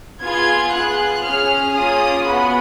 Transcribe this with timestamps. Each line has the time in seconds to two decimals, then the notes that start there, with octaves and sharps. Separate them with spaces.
0.22 B3 F4 G#4 G#6
0.73 B3 F4 G#4 F#6
1.25 C#4 G#4 F6
1.76 A#3 C#4 F4 G#4 D#6
2.28 B3 F#4 B5